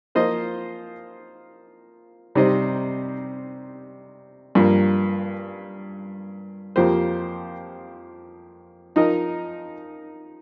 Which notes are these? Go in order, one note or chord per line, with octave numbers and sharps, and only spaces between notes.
F3 A#3 F4 C5 D#5
C3 G3 D#4 C5 D#5
G2 F3 A#3
F2 F3 A#3 G4 C5
F3 D#4 A#4 D#5